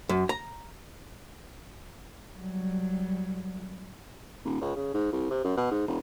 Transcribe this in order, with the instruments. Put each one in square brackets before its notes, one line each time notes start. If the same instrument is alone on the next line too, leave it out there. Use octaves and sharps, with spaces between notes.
[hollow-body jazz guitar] F#2
A#5
[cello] F#3 G3
[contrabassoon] D#1
C#2
C#3
G#2
C2
C3
F#2
B2
G#2
E1